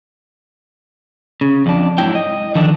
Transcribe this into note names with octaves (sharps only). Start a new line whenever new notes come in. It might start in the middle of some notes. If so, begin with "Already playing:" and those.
C#3
F2 D4
G#2 F#3 E4 G5
D#5
D3 D#3 F3 D4